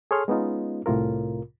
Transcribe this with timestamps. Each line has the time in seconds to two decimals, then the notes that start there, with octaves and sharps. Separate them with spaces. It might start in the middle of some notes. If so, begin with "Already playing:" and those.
0.11 G#4 A4 C#5 C6 F6
0.28 G#3 B3 C#4 D#4 F4
0.86 C2 A2 C3 F4 A#4